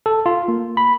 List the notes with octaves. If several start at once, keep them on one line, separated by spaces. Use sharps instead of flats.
A4
F4
A#3
B5